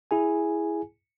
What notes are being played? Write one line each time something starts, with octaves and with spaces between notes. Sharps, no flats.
E4 G#4 G#5